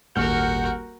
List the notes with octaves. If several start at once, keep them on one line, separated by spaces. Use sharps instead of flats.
D#1 G#1 F#4 A#4 F#5 F6 G6